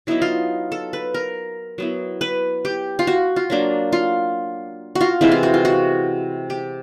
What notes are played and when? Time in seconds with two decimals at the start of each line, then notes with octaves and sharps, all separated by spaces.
0.07 F#3 B3 D#4 E4
0.22 F4
0.72 A4
0.93 B4
1.14 A#4
1.78 F#3 B3 E4
2.21 B4
2.65 G4
2.99 F4
3.07 F#4
3.36 F4
3.50 F#3 A#3 D4
3.93 F4
4.95 F#4
5.01 F4
5.21 C3 E3 G#3 C4 E4
5.32 F4
5.43 F#4
5.54 F4
5.65 F#4
6.50 G4